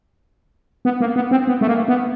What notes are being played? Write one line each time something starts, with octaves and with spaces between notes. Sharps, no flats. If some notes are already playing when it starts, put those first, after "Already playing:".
B3
A#3
B3
C4
B3
A3
A#3
B3